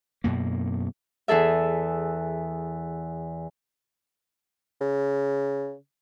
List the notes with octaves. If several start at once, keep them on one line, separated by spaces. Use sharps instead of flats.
F#2 B2 A#3
E2 G#4 A4 E5
C#3